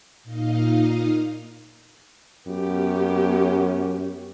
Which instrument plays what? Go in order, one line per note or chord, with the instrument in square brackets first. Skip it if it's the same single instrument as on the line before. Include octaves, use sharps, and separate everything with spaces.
[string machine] A#2 D#4 D#5 F5
[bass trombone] F#2 [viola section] B3 C#4 G4